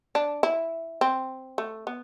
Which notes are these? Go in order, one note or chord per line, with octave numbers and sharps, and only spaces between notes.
D4
E4
C4
A3
B3